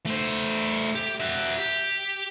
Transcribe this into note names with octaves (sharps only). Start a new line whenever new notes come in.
A3 C5
G4
F#4 E5
G4